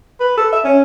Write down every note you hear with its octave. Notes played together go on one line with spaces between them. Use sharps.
B4
A4
E5
C#4